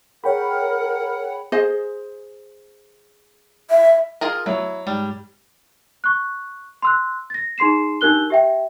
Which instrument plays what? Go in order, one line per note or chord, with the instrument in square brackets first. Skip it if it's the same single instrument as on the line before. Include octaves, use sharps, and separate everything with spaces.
[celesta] G#4 [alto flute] A#4 [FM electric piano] C#5 G5 B5 [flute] F#5
[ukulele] G#4 C5 D#5
[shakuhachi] E5
[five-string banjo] F4 G#4 A#4
[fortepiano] F#3 [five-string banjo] E4
[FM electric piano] G#2 G4 [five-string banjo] G3
[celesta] C#6 F#6
C6 E6 F#6
A6 A#6
D#4 G#4 C6 C7 E7
D4 D#4 G4 A#4 F#6 G7
G4 E5 G5